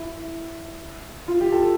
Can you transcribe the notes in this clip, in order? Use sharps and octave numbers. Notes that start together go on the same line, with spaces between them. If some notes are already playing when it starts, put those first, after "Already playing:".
Already playing: E4
F4
G4
A4